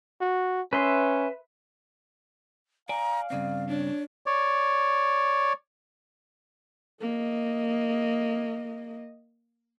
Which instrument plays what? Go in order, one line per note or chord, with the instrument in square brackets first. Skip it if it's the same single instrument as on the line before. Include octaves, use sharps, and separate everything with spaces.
[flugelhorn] F#4
[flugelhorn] C#4 [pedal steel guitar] B4 E5 C6
[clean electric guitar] D5 G#5 [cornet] F5 [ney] A#5
[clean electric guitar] G2 C#3 C4 [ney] D5
[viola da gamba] D4 [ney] C#5
[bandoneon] C#5 D5
[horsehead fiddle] A#3 D#5